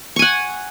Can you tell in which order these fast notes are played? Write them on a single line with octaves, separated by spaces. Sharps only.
C#6 G#5 F#5